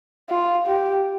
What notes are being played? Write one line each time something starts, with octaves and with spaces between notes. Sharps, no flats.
F4
G4